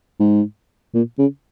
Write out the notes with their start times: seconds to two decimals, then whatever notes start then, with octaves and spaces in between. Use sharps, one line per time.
0.20 G#2
0.94 A#2
1.19 C#3